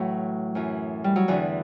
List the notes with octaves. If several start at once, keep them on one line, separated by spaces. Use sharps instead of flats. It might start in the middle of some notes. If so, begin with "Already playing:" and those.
Already playing: A2 E3 F#3
F#2 E3
G3
F#3
E2 D3 E3